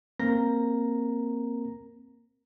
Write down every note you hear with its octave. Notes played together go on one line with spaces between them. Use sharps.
A#3 C4 A#4 A#5 A#6